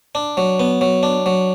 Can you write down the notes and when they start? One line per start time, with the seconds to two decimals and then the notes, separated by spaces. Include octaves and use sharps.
0.15 D4
0.37 F#3
0.60 B3
0.81 F#3
1.03 D4
1.26 F#3